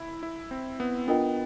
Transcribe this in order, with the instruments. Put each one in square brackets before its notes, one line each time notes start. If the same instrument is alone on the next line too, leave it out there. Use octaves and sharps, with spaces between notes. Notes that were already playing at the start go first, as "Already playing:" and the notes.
Already playing: [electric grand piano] E4
E4
C4
B3
[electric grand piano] B3 [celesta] D4 F4 A#4 D#5 G5